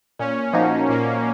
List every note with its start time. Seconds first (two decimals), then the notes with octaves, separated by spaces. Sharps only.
0.19 A#2 C#4
0.53 F3 A#3 D#4 F#4
0.89 A#2 A#3